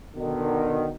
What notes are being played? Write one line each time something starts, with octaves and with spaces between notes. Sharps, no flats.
B2 D3 D#3